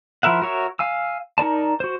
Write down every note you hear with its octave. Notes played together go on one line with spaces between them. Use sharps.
F3 E4 A#4 E5 F#5
F#4 A#4 C#5 E5
F5 G#5 E6
D#4 A#4 D5 A5
F#4 C5